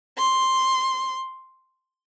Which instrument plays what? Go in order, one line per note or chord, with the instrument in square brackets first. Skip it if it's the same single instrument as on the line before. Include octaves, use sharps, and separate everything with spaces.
[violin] C6